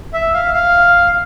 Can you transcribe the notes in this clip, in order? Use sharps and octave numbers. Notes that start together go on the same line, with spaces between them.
E5
F5
F5